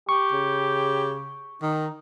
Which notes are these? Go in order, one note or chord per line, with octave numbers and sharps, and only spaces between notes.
G4 C#6
C#3
D#3 D#4